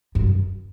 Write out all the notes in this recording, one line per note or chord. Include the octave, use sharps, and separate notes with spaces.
F#2